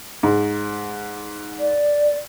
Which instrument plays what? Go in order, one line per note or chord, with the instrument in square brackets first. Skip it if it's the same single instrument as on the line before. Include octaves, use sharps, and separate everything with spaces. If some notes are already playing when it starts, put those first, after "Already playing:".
[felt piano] G#2
[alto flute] D5